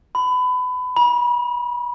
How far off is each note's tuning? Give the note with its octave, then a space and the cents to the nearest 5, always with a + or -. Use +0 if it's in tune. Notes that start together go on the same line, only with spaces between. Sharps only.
B5 +25
B5 -35